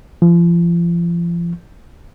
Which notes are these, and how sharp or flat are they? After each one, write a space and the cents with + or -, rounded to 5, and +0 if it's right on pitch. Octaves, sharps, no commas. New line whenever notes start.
F3 -35